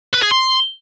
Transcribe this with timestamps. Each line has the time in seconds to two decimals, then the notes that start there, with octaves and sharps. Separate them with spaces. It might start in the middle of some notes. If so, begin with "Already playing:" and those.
0.14 B4
0.23 G#4
0.32 C6